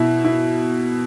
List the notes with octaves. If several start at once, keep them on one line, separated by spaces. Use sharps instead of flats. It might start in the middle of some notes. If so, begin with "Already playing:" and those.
Already playing: B2 E4
E4